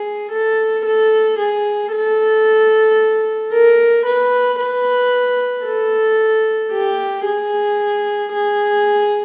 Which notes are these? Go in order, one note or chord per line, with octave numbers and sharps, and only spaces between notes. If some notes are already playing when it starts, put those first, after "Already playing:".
Already playing: G#4
A4
A4
G#4
A4
A#4
B4
B4
A4
G4
G#4
G#4